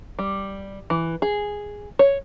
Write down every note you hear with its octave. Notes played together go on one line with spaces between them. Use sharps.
G3
E3
G#4
C#5